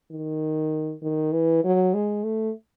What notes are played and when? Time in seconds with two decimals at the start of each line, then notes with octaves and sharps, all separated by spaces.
0.11 D#3
1.02 D#3
1.32 E3
1.64 F#3
1.94 G#3
2.24 A3